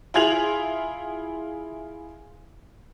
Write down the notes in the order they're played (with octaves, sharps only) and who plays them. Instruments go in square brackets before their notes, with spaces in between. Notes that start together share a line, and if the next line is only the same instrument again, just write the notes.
[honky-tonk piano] E4 F4 G#4 G#6 F7 F#7